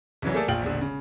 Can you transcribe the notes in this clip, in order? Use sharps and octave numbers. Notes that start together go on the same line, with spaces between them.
C2 C#3 E3 F#3
A3 A#3 G#4 A4 D5
A#1 F4 G5 F#7
E1 A#1 D3
C#3